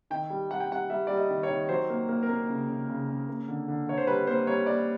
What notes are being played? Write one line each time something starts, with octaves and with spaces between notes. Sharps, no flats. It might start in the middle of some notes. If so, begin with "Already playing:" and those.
D#3 G5
G3
G3 F#5
G5
G3 F#5
G3 E5
G3 D5
D#5
D#3
C#5
D#3
F#3 C5
A#3
A#3
A#4
A#3
C#3
C#3
C#3
C#3
A#3
D3
D3
D3 C#5
C5
G3 B4
A#3 C5
G3 C#5
A#3 D5